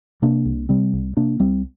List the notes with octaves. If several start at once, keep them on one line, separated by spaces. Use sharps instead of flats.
C3 A#3 D4
C2
C3 G3 C4
C2
C3 A#3 D4
C2 G3 C4